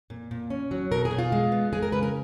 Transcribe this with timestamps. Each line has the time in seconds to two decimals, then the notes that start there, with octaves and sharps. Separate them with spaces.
0.10 A#2
0.31 A#2
0.50 C#4
0.71 F#3
0.91 B2 A#4
1.05 G#4
1.11 B2
1.18 F4
1.32 G#3
1.52 B3
1.73 G#3 G#4
1.83 A#4
1.92 C#3 B4
2.03 A#4